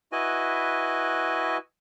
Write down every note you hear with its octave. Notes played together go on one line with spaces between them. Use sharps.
E4 F#4 B4 D#5 G#5